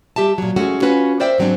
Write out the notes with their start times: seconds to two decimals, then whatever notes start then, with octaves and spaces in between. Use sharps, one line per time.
0.16 G3 G4 E5 A5
0.38 A#2 F#3
0.56 G#3 A3 C#4 F#4
0.82 C#4 F4 F#4 B4
1.20 A#4 C5 D5 E5 G5
1.38 G#2 F#3 C4 D4